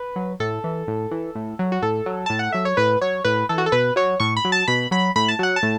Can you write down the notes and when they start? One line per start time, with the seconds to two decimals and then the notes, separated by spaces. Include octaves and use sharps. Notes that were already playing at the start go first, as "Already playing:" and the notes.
Already playing: B4
0.16 F#3
0.40 A2 A4
0.64 E3
0.87 A2
1.11 E3
1.35 A2
1.59 F#3
1.72 F#4
1.82 A2 A4
2.06 F#3
2.26 A2 A5
2.39 F#5
2.52 F#3 E5
2.65 C#5
2.77 A2 B4
3.01 F#3 C#5
3.24 A2 B4
3.49 E3 A4
3.58 F#4
3.66 A4
3.72 B2 B4
3.96 F#3 C#5
4.20 A2 C#6
4.37 B5
4.45 F#3
4.52 A5
4.68 B2 B5
4.91 F#3 B5
5.16 A2 B5
5.28 A5
5.39 F#3 F#5
5.56 A5
5.63 A2